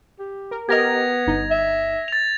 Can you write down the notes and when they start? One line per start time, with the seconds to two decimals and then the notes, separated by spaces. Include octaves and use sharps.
0.19 G4
0.51 A#4
0.69 B3 G4 A#4 D#5 G#6 A#6 F7
1.27 G1 D#4
1.50 E5
2.08 A6 F7